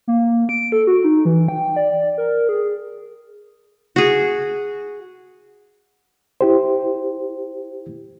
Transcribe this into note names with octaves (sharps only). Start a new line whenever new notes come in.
A#3
D7
A4
F#4
D#4
E3
G5
D5
A#4
G#4
F#4 G#4
E4 G4 C5